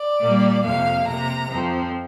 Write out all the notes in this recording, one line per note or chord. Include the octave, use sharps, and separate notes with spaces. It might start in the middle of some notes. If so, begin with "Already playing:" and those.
Already playing: D5
A#2 G3 A#3
F2 C3 A#3 F5
C3 A#3 A#5
F2 F3 C4